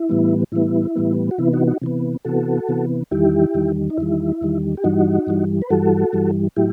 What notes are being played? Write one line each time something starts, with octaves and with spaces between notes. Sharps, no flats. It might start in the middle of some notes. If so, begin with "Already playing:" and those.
Already playing: E4
A2 E3 G3 B3
A2 E3 G3 B3 E4
A2 E3 G3 B3
F#4
C3 E3 B3 E4
D#4 F#4
D#4 F#4
C3 E3 B3
C3 E3 B3 F#4 A4
C3 E3 B3
E2 D#3 G3 E4 G4
E2 D#3 G3
D#4
E2 D#3 G3 E4
E2 D#3 G3
G4
G2 E3 G3 D#4 F#4
G2 E3 G3
B4
G2 E3 G3 F#4 A4
G2 E3 G3
A2 F#3 E4 G4